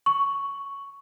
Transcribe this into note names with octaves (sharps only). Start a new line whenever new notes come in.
C#6